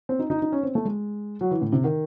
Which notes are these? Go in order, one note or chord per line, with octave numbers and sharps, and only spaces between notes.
C4
D#4
D#4
D#4
C#4
C4
A3
G#3
F#3
E3
A2
C3
D#3